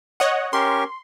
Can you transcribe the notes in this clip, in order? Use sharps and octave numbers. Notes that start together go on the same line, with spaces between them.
C#5 D#5 F#5
C#4 G4 A#4 C6